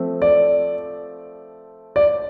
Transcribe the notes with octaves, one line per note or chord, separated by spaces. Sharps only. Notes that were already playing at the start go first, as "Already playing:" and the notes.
Already playing: F3 A3 C4
D5
D5